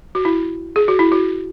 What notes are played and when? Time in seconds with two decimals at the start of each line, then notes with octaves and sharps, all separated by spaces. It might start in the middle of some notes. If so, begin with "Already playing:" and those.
0.15 F#4
0.25 E4
0.76 G#4
0.88 F#4
0.99 E4
1.12 F#4